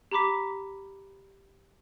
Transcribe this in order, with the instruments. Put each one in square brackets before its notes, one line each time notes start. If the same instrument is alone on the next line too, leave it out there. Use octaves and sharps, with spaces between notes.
[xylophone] G4 A#5 B5 D6 B6